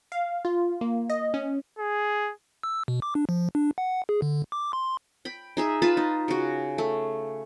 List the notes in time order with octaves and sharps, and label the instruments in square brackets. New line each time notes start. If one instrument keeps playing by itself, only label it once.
[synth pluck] F5
F4
A#3
D#5
C#4
[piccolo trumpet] G#4
[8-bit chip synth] E6
B2
D6
D4
F3
D4
F#5
G#4
D3
D6
C6
[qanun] G5 B5
D#4 G#4 E5
F4 B4 A5 B5
D#4
C#3 F#4
A3